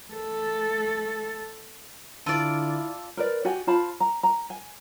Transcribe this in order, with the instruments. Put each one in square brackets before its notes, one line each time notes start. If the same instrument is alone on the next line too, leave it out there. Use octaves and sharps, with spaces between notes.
[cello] A3 A4
[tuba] D3 [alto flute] E4 [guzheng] F4 D5 [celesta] A5 E6 D#7
[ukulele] A#4 B4 D5
F#4 G4 D5 G#5
F4 C5 A5 B5
A#5
A#5
G#5